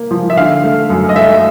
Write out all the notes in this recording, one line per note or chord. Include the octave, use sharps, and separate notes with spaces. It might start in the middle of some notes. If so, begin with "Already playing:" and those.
Already playing: A#3
F3
E5
D3 F5
A3
F#2
D#5
A3 E5